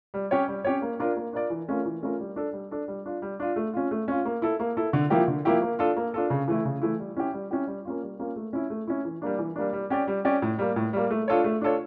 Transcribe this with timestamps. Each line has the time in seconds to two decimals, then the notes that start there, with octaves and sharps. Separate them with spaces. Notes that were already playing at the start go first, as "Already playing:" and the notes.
0.14 G3
0.31 C#4 G4 C#5
0.48 G3
0.64 C#4 G4 C#5
0.82 A#3
1.00 D4 F4 A#4 D5
1.16 A#3
1.33 D4 F4 A#4 D5
1.50 E3
1.68 A3 C#4 F4 A#4
1.86 E3
2.02 A3 C#4 F4 A#4
2.20 G3
2.36 D4 A4
2.53 G3
2.71 D4 A4
2.88 G3
3.06 D4 F4
3.22 G3
3.40 D4 F4
3.56 A3
3.74 C#4 F4
3.91 A3
4.08 C#4 F4
4.25 A#3
4.42 E4 A4
4.60 A#3
4.77 E4 A4
4.93 D3
5.10 F3 A#3 E4 G4
5.28 D3
5.45 F3 A#3 E4 G4
5.62 A#3
5.79 D4 F4 A4
5.97 A#3
6.14 D4 F4 A4
6.30 C#3
6.48 E3 A3 E4
6.65 C#3
6.82 E3 A3 E4
6.99 G3
7.17 C#4 E4 G4
7.34 G3
7.51 C#4 E4 G4
7.67 G3
7.85 A#3 C#4 F4
8.03 G3
8.19 A#3 C#4 F4
8.36 A3
8.53 C#4 E4
8.70 A3
8.87 C#4 E4
9.05 E3
9.22 G3 A#3 D4
9.39 E3
9.56 G3 A#3 D4
9.73 G3
9.90 C#4 G4 D5
10.08 G3
10.25 C#4 G4 D5
10.42 A2
10.58 G3 A#3
10.76 A2
10.93 G3 A#3
11.11 A3
11.28 D4 F4 A4 C#5
11.44 A3
11.61 D4 F4 A4 C#5